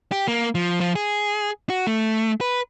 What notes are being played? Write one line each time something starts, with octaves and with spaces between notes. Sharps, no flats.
G4
A#3
F3
F3
G#4
F#4
A3
B4